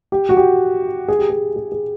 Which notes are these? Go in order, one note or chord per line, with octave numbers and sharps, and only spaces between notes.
G4
F#4
G4
G#4
G4
G#4
G#4
G#4